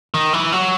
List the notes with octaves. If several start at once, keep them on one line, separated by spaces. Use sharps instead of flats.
D#3
E3
F#3